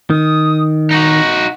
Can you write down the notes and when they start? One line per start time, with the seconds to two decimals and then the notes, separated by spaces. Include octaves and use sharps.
0.10 D#3 D#6
0.91 D#4 F#4 A#6